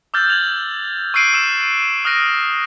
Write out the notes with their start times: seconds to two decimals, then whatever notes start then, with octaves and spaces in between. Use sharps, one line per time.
0.14 D6 E6 F6 G6 A6
0.30 G#6 F7 F#7
1.14 C#6 E6 F#6 C7 D7 D#7
1.34 E6 D#7 E7
2.05 D#6 F6 F#6 A#6 D7 D#7